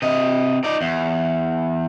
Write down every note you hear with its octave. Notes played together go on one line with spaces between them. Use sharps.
C3 D#5
D#4 D5
E2